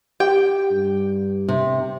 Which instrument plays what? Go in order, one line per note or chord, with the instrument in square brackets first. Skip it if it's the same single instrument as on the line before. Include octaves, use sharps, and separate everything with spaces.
[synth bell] G4 [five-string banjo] G5
[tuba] G2
[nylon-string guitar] C3